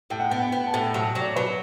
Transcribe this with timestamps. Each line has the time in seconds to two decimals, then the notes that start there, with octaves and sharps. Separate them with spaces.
0.10 A2 G5
0.20 F#5
0.30 B3 G5
0.42 G5
0.52 B3
0.67 A5
0.73 A2 G5
0.94 F#3
0.99 A5
1.05 G5
1.15 F#3 D5
1.27 C#5
1.36 F#3 B4